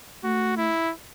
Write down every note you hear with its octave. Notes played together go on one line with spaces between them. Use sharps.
A3 F#4
E4